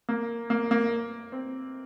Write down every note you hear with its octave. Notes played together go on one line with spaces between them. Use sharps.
A#3
A#3
A#3
C4